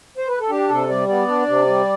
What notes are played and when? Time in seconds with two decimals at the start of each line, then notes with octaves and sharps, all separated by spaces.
0.17 C5
0.28 B4
0.40 A4
0.50 D4 G4
0.69 C3 A4
0.89 G3 D5
1.09 B3 D5
1.28 D4
1.48 C3
1.67 G3